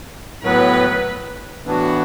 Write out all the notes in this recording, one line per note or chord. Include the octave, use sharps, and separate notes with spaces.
A2 F#3 B3 B4
A2 E3 B3 D4 F#4